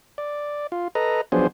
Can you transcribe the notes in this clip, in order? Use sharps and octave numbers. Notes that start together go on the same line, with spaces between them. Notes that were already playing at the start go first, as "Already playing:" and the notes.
D5
F4
A4 B4 D#5 A#5
F3 F#3 B3 D4 G#4 C5